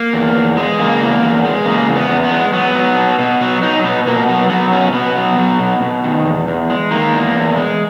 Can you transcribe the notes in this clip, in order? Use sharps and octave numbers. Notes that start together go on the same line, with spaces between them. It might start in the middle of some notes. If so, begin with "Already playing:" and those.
Already playing: A#3
E2
E2
G#3
C#3 A#3
E2
E2
G#3
C#3 A#3
E2
B3
E2
B3
G#3
F#3 B3
F#3
B2
B2
F#3 B3
F#3 D#4
B2 B3
B2 A#3
F#3 B3
F#3 B3
B2 C#4
B2 B3
F#3
F#3
B2
B2
D#3
E2
E2
G#3
D#3 A#3
E2
E2
G#3